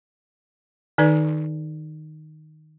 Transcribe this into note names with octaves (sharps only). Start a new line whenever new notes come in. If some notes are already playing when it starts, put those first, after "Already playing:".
D#3 D#4 B4 D5